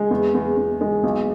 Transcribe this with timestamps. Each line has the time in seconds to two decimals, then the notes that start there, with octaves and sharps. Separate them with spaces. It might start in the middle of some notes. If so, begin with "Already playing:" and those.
Already playing: G#3
0.11 E2
0.34 E2
0.57 E2
0.81 G#3
1.03 B1